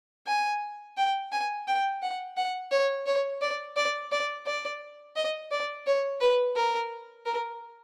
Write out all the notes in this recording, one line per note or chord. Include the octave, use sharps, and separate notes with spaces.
G#5
G5
G#5
G5
F#5
F#5
C#5
C#5
D5
D5
D5
D5
D#5
D5
C#5
B4
A#4
A#4